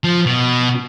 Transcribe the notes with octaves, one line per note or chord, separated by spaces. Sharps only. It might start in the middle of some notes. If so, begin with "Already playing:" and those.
F3
B2